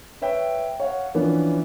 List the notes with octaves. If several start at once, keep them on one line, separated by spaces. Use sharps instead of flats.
B4 C#5 E5 G5
C#5 F5 F#5
E3 F3 B3 C#4 D4